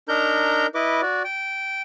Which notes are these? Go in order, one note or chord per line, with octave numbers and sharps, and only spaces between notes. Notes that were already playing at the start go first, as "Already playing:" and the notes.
D4 D#4 A#4 A#5 G6
E4 B4 D#5 D6
F#4 D5
G5